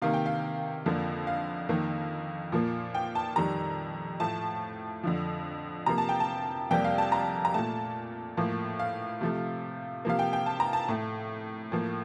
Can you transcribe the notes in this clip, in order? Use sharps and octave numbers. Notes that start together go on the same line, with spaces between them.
C3 D#3 A#3 F5
G5
F5
F2 D3 F3 A#3
F5
F2 D#3 A#3
A#2 F3 A#3
G5
A5
F2 D#3 G3 A#5
A2 F3 A3 A5
F2 D3 F3
C3 F3 A#3 A#5
A5
G5
A5
F2 C3 G3 A#3 G5
F5
A5
A#5
A#5
A#2 A3 A5
A2 F3 A#3
F5
C3 F3 A3
C3 F3 A#3 F5
G5
G5
A5
A#5
A5
A2 A3
A2 F3 A#3